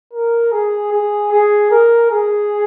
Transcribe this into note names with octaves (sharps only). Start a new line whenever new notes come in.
A#4
G#4
G#4
G#4
A#4
G#4